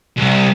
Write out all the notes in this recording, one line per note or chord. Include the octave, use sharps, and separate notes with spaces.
C2